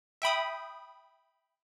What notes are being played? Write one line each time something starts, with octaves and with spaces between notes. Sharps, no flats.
E5 G5 B5 D#6